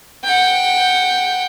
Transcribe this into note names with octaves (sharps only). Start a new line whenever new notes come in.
F#5 G5